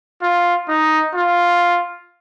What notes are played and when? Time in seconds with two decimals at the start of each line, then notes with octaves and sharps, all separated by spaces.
0.22 F4
0.69 D#4
1.15 F4